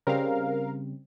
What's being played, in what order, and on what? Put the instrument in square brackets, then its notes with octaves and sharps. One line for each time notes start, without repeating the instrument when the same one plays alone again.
[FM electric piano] C#3 G3 C4 [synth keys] A#4 F5